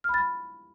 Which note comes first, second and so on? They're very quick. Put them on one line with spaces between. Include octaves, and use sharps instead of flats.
F6 B5 A6